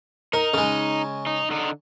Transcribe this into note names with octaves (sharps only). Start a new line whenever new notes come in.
D#4 A#4
C#3 G#3
D#4
D3 D#4